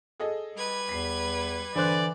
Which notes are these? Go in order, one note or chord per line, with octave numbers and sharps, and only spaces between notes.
G#4 A4 D#5
G3 B4 G#6
E2 B6 C7
D3 E3 C5 D5 F#6